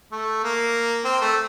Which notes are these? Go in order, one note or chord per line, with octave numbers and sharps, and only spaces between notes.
A3
A#3
C4
A3